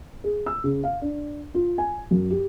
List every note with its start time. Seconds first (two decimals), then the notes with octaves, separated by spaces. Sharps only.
0.24 G#4
0.46 E6
0.64 C#3
0.84 F5
1.01 D4
1.54 F4
1.78 G#5
2.11 F#2
2.30 G4